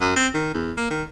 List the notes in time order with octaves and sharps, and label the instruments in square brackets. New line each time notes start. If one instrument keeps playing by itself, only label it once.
[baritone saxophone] F#2
C4
D#3
E2
A#3
D#3